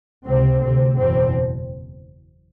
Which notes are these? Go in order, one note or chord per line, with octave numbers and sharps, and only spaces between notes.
C#2 C3 C4
D2 C3 C4
F#1 E2 B2 C4